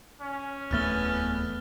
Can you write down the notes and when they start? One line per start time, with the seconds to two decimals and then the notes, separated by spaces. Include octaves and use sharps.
0.21 C#4
0.71 D1 E2 A3 B3 F6 A6 G7